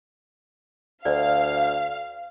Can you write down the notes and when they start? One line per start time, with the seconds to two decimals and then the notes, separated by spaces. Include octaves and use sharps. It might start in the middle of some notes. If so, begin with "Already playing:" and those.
1.05 D2 C5 D5 F5